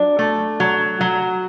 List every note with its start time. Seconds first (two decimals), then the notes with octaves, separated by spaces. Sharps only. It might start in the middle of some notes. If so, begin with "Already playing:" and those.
Already playing: F#3 D4
0.19 A3
0.60 F#3
1.01 F#3